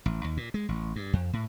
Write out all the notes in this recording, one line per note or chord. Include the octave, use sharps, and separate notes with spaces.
A1
D#2
A#2
G#3
A1
G2
F2
A2